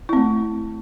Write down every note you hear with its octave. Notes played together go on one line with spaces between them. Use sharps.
A3 C4 E4